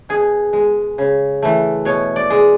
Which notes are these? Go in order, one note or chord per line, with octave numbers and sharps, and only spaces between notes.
B2 G#4
G#3
C#3
E3 A3
B2 C#5
D5
G#3